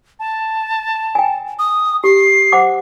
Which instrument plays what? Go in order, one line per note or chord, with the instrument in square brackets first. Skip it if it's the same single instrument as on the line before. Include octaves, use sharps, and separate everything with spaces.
[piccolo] A5
[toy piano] G5 G#5
[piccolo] D#6
[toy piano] G4 [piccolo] C7
[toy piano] C5 F#5 D6